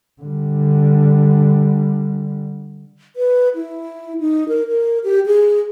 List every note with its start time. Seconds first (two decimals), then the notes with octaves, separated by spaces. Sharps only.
0.22 D3 G3
3.16 B4
3.55 E4
4.20 D#4
4.48 A#4
4.68 A#4
5.04 G4
5.26 G#4